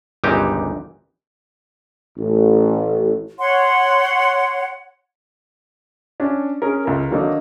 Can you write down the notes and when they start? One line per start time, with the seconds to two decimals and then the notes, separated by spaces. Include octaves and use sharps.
0.24 G1 C#2 A#2 E3 D#4 G4
2.18 A1
3.40 C#5 F#5 C6
6.20 C#4 D4
6.62 C#4 G#4 A#4
6.85 C#2 A#4
7.10 D3 D#3 F#3 A#3 D4 D#4